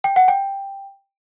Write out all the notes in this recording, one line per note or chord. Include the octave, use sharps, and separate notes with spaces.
G5
F#5
G5